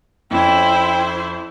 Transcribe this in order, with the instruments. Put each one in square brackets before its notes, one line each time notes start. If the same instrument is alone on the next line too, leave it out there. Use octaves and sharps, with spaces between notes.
[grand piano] F2 C#4 [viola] E4 C5 [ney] G5